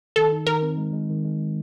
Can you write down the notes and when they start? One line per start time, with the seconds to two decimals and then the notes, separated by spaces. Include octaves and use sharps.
0.16 D#3 A4
0.32 D#4
0.47 D#3 A#4
0.62 C4
0.77 G#3
0.93 G#3
1.10 D#3
1.24 G#3